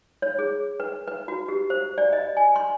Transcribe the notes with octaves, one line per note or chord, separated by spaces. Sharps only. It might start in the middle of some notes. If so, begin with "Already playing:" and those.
C#5
G#4
B4
B4
F#4
G4
C5
D5
D#5
G#5
C6